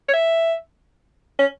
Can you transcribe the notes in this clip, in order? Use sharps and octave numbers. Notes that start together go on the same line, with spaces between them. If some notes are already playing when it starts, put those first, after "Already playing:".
C#5
E5
C#4